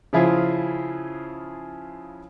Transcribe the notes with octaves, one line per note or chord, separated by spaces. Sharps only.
C#3 F3 E4 F4 G#4